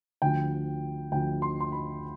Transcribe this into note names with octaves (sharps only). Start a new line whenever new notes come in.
D2 D3 F3 G5
D2 D3 F3 G5
C6
C6
B5